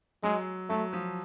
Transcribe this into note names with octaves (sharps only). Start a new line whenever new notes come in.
F#3 G#3
F#3 A3
F3